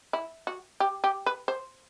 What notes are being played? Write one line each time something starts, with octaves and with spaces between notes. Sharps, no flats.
E4
F#4
G4
G4
B4
C5